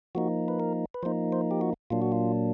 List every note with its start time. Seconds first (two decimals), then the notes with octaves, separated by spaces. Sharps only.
0.15 F3 A#3 D#4 F#4
0.48 B4
0.60 A#4
0.94 B4
1.03 F3 A#3 D#4 C5
1.32 C5
1.51 G4
1.61 F#4
1.90 A#2 F#3 A#3 D4 F4
2.02 F#4
2.12 F4